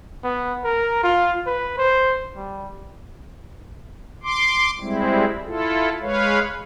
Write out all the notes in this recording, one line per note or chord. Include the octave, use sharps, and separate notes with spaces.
B3
A#4
F4
B4
C5
G3
C6 D6
G3 G#3 C4 E4
E4 F4 A4
G#3 B4 C#5 F5